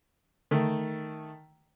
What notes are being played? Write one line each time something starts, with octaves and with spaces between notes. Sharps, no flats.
D#3 A3